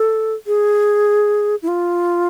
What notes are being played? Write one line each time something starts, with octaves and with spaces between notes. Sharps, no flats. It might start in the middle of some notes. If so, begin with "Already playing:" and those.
Already playing: A4
G#4
E4
F4